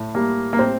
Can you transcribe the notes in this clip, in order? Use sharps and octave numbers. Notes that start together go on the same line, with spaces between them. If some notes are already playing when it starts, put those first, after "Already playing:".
Already playing: A2
G3 A#3
A#3
A2 C4